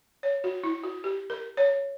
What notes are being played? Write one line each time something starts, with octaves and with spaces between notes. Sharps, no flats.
C#5
F#4
E4
F#4
G4
A#4
C#5